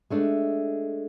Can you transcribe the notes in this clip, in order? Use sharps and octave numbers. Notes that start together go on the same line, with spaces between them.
G#3 A3 D4